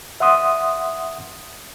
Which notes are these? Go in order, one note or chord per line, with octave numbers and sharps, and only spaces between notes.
E5 F#5 C6 D#6